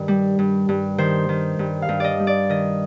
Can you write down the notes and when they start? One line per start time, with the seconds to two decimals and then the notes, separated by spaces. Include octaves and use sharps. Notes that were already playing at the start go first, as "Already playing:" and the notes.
Already playing: G2 D#3
0.08 G3
0.39 G2
0.69 G2
0.98 D#3 C5
1.29 D#3
1.59 G2
1.82 F5
1.89 G2
2.00 D5 D#5
2.20 G3
2.27 D5
2.49 D#3 D#5